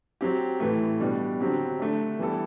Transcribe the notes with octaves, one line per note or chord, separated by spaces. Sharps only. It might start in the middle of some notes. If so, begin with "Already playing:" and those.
F#3 C4 G4
A2 E3 A3
B2 G3 D4
D3 F#3 C4 G4
D3 A3 D4
E3 G3 B3 E4 A4